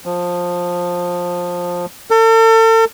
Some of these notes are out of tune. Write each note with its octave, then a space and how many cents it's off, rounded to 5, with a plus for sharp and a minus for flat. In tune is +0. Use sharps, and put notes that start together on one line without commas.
F3 +15
A4 +40